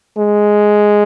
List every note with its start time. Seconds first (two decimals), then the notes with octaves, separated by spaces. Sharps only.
0.18 G#3